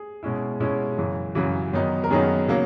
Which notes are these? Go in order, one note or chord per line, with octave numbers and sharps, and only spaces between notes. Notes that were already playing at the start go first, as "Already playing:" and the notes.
Already playing: G#4
B2 G#3 C#4 E4
B2 G#3 C#4 E4
F#2 C#3 E3
F#2 C#3 E3 F#4
F#2 D#3 F#3 B3 D#4
A#4
F#2 D#3 F#3 B3 D#4 G#4
C#3 F#3 A#3